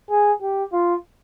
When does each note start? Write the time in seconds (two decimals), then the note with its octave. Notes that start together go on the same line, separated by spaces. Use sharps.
0.10 G#4
0.42 G4
0.73 F4